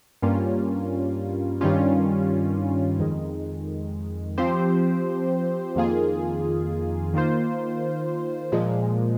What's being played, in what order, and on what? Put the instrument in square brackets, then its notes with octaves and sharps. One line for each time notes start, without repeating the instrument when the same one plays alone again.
[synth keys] G2 G3 A#3 C#4 F4
G2 D#3 G3 C#4 F4
F2 D#3 G#3
F3 C4 G4 C5
F2 D#3 A#3 F4 G#4
D#3 A#3 F4 C5
A#2 F3 G#3